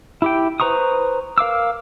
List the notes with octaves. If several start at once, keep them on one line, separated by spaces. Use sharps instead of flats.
E4 G4 G5
B4 C5 A#5 C#6 D#6
A#4 F5 D6 E6